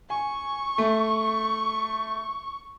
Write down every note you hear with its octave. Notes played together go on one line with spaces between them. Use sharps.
G#5 C#6
A3